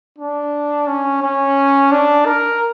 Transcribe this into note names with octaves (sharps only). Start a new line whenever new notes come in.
D4
C#4
C#4
D4
A#4